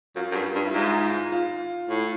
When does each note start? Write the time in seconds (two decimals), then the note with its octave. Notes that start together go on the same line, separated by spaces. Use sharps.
0.16 F#2 F4
0.31 F#2
0.35 G2
0.55 G2
0.67 E4
0.74 G#2 F4
1.32 F4
1.90 A2